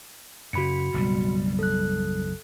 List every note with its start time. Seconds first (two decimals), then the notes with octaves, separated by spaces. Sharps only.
0.53 F#2 C#3 F#4 B5 C#7
0.94 F#1 B1 B2 G3
1.59 A4 F#6